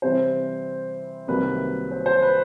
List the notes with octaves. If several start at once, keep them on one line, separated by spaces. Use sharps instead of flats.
C3 E3 G3 C4 C5
C2 C3 D#3 F#3 A#3 B4
C5
C5
B4